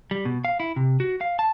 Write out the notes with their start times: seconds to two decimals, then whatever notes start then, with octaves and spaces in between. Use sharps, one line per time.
0.11 G3
0.25 B2
0.45 F5
0.60 E4
0.76 C3
1.00 F#4
1.21 F5
1.39 A5